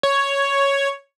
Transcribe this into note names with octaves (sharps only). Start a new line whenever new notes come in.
C#5